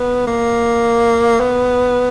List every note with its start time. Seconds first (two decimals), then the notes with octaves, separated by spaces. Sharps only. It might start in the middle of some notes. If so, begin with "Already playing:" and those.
Already playing: B3
0.27 A#3
1.40 B3